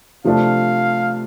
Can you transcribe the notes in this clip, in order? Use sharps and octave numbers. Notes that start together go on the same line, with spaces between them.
C3 F3 A3 D4 F5